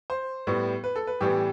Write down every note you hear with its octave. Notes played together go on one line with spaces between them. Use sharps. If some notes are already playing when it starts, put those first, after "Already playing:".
C5
A2 G3 B3
B4
A4
B4
A2 E3 G3 B3 G4